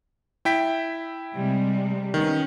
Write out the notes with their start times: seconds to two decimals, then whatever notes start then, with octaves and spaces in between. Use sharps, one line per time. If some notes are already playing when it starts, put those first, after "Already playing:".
0.45 E4 G5 B6
1.35 C3 G3 G#3
2.14 D#3 B3 C#4